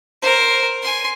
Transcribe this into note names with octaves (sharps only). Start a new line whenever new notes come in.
A#4 C5
G#5 C6